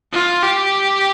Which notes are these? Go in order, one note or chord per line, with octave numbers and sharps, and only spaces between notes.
F4
G4